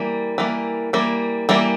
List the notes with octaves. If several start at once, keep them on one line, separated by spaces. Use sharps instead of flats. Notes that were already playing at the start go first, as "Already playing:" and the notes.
Already playing: E3 G3 A#3
E3 G3 A#3
E3 G3 A#3
E3 G3 A#3